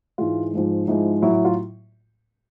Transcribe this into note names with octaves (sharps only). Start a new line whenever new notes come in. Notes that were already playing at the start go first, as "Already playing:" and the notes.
G#2 E3 G#3 F4
G#2 F3 G#3
G#2 F3 G#3 E4
A2 F#3 E4
E4
F4